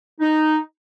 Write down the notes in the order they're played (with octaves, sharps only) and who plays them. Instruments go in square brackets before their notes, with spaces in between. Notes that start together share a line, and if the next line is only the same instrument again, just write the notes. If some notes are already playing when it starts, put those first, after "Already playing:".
[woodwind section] D#4